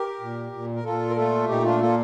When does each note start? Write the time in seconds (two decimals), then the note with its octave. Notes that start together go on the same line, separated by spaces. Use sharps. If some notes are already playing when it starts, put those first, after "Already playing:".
Already playing: G4 A#4
0.21 A#2
0.52 A#2
0.75 A#4
0.84 A#2 F4 A4
1.10 A#4
1.16 A3 F4 A4
1.48 A#2 D#4 G4
1.64 D4 F4
1.80 A#3 F4 A4